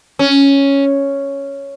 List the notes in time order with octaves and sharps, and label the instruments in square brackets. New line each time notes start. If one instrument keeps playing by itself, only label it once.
[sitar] C#4